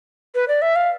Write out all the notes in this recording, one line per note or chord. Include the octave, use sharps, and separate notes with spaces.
B4
D5
E5
F5